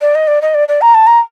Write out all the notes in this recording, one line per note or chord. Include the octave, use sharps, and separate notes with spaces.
D5
D#5
D5
D#5
D5
D5
A#5
A5
A#5